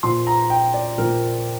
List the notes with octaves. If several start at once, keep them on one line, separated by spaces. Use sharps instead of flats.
A#2 F3 C6
A#5
G5
D5
A#2 F3 A#4